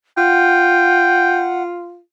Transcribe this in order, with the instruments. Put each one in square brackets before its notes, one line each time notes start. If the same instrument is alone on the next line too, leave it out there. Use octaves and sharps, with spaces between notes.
[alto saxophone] F4 [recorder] F#5 [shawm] G5